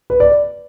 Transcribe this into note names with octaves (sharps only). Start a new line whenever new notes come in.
B4
D5